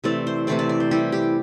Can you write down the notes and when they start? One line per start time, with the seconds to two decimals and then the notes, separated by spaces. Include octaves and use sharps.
0.04 C3 E3 A3 C4 D5
0.27 C5
0.47 C3 E3 A3 C4 D5
0.59 D5
0.69 D5
0.80 C5
0.91 E3 G3 E4 G4
1.12 G4